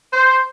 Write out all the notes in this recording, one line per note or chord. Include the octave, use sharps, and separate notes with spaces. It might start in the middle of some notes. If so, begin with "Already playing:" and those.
C5